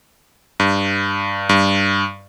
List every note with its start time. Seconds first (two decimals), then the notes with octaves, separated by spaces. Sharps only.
0.60 G2
1.49 G2